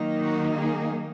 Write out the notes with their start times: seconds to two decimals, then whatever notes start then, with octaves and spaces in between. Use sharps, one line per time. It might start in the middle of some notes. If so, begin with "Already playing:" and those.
Already playing: D#3 F#3 A#3 D#4
0.22 F#4
0.59 G#4